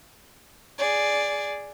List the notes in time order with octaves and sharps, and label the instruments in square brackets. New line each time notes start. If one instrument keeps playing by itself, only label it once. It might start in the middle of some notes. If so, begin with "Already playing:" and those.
[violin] G#4 D5